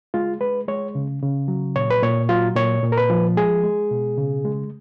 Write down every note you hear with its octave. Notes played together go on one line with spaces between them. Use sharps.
G#3 F4
G#3 B4
G#3 C#5
C#3
C#3
F#3
A#2 C#5
B4
A#2 C#5
F#3 F4
A#2 C#5
A#2
A#4
B4
F3
G#3 G#4
G#3
B2
C#3
G#3